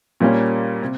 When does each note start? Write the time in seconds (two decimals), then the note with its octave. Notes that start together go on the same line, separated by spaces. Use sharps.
0.20 A#2 G3 A#3 C#4 F4
0.82 C3